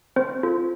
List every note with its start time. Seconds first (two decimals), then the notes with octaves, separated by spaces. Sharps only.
0.16 C4 C5
0.43 F4 A4